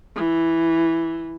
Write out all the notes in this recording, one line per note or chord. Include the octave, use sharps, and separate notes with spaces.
E3